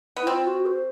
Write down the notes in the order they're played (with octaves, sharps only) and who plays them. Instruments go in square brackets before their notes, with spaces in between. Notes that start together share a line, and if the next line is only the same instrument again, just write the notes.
[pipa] B3
[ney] E4
[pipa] C4 [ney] F4
[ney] F#4
C5